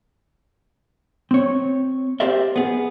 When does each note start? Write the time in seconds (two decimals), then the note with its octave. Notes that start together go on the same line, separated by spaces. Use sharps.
1.31 C4 C#5
2.20 G4 A#4 C5 D5 E5
2.56 B3 G#4